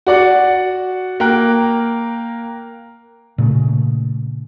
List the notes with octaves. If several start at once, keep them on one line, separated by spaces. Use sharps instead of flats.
F#4 D5 F#5
A#3 A#4 G5 F#6
A#2 C#3 A3